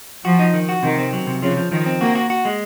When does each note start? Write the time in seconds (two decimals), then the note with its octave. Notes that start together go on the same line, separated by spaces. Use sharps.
0.24 F3 F#4
0.39 D#4
0.54 D#3
0.69 F#4
0.83 C3 D#3
0.98 C4
1.13 F#3
1.27 C3
1.42 C#3 F3
1.57 F3
1.71 D#3 F3
1.86 C4
2.01 A#3 F#4
2.15 F#4
2.30 F#4
2.45 G#3